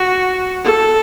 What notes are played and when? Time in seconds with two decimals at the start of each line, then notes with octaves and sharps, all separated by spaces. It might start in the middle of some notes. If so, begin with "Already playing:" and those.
Already playing: F#4
0.64 A4